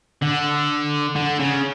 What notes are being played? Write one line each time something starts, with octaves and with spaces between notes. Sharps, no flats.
D3
D3
C#3